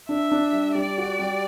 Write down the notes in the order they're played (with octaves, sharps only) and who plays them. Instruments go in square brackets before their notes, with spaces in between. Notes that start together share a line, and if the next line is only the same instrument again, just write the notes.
[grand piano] D4 [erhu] E5
[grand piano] D4
G3
[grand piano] G3 [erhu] D5
[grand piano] F#4
G3